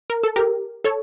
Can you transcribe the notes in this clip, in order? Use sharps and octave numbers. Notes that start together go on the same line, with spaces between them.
A#4
A4
G4 A#4
A4 C#5